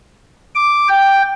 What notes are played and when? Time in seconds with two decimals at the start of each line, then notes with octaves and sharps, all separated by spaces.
0.55 D6
0.89 G5